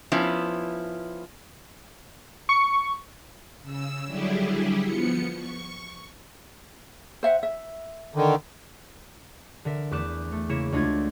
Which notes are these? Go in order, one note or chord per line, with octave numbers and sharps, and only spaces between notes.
F3 B3 C#4 E4
C#6
C#3 E6
D3 F#3 G3 E4 G4 G#4
F3 B3 C#7
C#6
C5 E5 F#5
E5
D3 D#3
D3 A#4 E5
E2 A3 D6 F#6 E7
A3
C#3 A#3 E4 C#7 E7
D2 G#3 A3 D4 F4 G#6